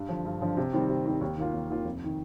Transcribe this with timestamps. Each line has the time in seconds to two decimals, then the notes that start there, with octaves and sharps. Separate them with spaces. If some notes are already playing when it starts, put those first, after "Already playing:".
Already playing: G2
0.09 D3 F3
0.25 G2
0.41 D3 F3
0.57 C3
0.73 D#3 G3 C4
0.89 C3
1.06 D#3 G3 C4
1.21 D#2
1.37 D#3 A#3 F4
1.53 D#2
1.69 D#3 A#3 F4
1.85 F1
2.04 D#3